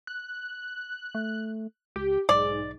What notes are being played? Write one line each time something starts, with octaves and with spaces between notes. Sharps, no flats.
F#6
A3
C#2 G4
B1 G#2 D5